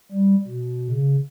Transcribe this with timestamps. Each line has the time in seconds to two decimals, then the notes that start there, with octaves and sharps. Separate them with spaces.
0.12 G3
0.48 B2
0.90 C#3